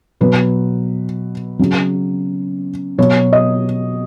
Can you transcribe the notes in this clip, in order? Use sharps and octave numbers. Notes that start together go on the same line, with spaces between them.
B2 F#3 B4
C#3 F#3
B2 F#3 C#5
D#5